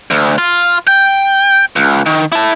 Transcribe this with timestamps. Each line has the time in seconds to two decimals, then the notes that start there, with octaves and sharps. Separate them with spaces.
0.11 D2
0.38 F4
0.87 G5
1.76 C#2
2.06 D#3
2.32 E4 A5